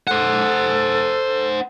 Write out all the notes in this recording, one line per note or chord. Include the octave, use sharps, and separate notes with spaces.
A4 C5 F#5